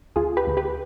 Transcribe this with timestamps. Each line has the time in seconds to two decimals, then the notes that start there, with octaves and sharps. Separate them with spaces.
0.16 D2 F4 G#4
0.37 G4 B4
0.47 D2
0.57 G4 B4